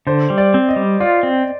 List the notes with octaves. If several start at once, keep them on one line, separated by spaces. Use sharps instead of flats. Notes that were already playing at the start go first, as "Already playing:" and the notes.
D3 C5
G3
D5
C4
D#5
G3
F4 D5
C4